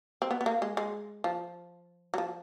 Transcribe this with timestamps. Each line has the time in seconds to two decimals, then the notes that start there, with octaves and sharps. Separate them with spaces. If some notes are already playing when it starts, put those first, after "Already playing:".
0.22 C4
0.31 B3
0.41 B3
0.46 A#3
0.62 G#3
0.77 G#3
1.24 F3
2.14 F#3
2.18 F3